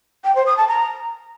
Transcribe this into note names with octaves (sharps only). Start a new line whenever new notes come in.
G5
C5
D#6
A5
A#5